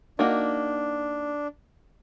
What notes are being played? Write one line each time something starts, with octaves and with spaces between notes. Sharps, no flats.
A#3 D4 D#4 F#4